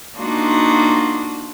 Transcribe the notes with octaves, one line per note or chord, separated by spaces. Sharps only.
A#3 D4 D#4 F4 F#4